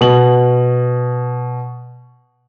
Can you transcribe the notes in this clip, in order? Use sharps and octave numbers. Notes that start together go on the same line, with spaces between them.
B2 F#7